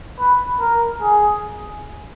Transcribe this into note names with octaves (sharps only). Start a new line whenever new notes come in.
B4
A#4
G#4